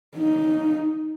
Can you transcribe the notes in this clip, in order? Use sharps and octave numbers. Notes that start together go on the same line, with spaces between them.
D#4